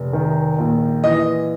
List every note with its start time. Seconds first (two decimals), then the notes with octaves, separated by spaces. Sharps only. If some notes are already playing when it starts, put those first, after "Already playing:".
Already playing: F1
0.13 D#3
0.58 A#1
1.04 E3 D#5